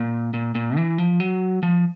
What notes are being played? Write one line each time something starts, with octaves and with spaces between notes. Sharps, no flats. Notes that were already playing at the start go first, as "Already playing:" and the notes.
Already playing: A#2
A#2
A#2
E3
F3
F#3
F3